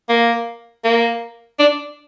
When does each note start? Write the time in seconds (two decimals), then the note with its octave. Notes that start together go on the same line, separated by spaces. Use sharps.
0.09 A#3
0.84 A#3
1.59 D4